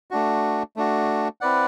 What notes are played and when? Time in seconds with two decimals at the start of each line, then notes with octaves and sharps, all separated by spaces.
0.11 A3 D4 F#4
0.76 A3 D4 F#4
1.41 C4 E4 B4 D5 F#5